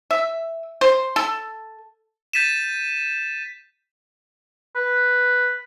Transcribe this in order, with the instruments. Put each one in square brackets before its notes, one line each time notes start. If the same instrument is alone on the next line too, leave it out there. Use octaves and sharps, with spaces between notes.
[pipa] E5
C5
A4
[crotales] G6 A6 B6 D#7 E7
[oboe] B4